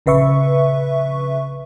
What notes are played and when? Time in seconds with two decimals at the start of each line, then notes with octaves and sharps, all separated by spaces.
0.06 A#1 C#3 B4 E5 C#6